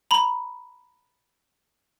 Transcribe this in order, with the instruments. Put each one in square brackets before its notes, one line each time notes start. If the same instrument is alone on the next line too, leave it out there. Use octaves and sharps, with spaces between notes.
[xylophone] A#5 B5